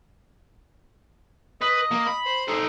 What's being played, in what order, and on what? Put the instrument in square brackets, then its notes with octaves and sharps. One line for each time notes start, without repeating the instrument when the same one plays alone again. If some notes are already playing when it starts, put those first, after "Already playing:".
[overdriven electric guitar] B4 [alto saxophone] D#5
[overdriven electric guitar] A#3
B5
[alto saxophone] C5
[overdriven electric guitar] D#4 A4